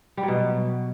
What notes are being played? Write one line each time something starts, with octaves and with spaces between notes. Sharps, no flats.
G3
F#3
B2